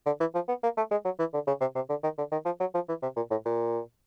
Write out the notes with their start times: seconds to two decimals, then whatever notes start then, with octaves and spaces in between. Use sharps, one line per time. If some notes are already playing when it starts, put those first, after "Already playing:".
0.06 D3
0.20 E3
0.35 F3
0.48 B3
0.63 A#3
0.77 A3
0.91 G#3
1.05 F#3
1.19 E3
1.34 D3
1.47 C#3
1.61 C3
1.75 C3
1.89 D3
2.03 D#3
2.18 D3
2.32 D#3
2.45 F3
2.60 F#3
2.74 F3
2.89 E3
3.02 C3
3.16 A#2
3.31 A2
3.45 A#2